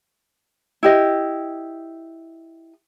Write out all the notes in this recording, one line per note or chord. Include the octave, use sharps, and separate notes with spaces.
E4 G4 D#5